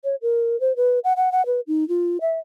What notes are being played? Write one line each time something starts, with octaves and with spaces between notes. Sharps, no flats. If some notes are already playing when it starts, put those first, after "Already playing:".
C#5
A#4
C5
B4
F#5
F#5
F#5
B4
D#4
F4
E5